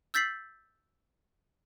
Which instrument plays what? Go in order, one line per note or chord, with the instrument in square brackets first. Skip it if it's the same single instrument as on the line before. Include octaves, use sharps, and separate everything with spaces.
[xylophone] E6 G6 A6 B6 C7 F#7